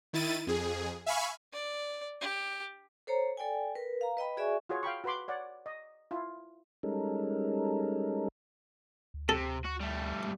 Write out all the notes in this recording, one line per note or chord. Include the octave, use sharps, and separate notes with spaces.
D#3 E4 A6 D#7
F2 G#4
E5 F5 G#5 B5 C#6
D5
G4
A4 C5 C#5 A#5
A4 D5 G5 G#5
A#4 B4
F5 A#5
B4 D#5 G5 B5
F#4 G#4 D5 E5 G#5 C#6
F4 F#4 G#4 C#5
F5 G5 B5 C#6
F#4 B4 B5 C6 D6
C#5 D5 F#5
D#5
E4 F4
G3 G#3 C#4 D#4 A4 A#4
D2
C3 A4
F#4
G3 A3